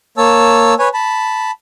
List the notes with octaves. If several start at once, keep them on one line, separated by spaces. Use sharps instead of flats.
A#3 C#5 A5 E6
B4 C#5 G#5
A5 B5